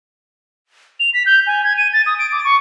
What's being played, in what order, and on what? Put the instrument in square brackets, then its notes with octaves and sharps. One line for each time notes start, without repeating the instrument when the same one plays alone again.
[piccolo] F7
B6
G6
G#5
G#6
D#7
A6
D#6
D7
D6
C#6